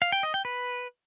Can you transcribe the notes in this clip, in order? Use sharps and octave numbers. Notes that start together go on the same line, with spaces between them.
F5
G5
D#5
G5
B4